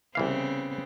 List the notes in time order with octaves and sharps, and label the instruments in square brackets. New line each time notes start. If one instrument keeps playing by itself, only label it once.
[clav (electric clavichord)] C2 E3 F5 [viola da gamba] C#3 B3 C4